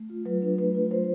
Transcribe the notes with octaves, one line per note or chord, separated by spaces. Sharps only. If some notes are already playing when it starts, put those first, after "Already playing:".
Already playing: A3
F4
F#3 B4
D4
A3 B4
F4
F#3 C5